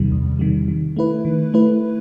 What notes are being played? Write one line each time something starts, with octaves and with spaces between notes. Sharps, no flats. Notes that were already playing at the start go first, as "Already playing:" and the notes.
Already playing: E2 C3 D#3 G3
E2
C3 D#3 G3
D#3
A3 E4 B4
D#3
A3 E4 B4